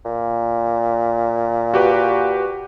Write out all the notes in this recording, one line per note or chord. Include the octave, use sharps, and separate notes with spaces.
A#2
F#4 G4 B4